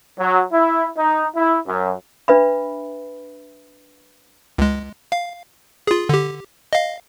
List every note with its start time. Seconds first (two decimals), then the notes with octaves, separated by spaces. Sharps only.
0.19 F#3
0.53 E4
0.98 D#4
1.36 E4
1.67 F#2
2.28 D4 B4 E5 B5
4.58 C#2 G#3
5.12 F5
5.87 F4 G#4
6.09 D3 G4
6.73 D#5 F5